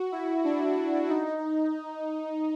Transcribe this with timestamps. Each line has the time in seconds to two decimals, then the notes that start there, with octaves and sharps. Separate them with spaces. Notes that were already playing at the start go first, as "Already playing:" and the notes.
Already playing: F#4
0.12 E4
0.45 D4
1.10 D#4